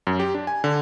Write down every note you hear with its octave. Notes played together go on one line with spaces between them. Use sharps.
F#2
G4
D4
G#5
D3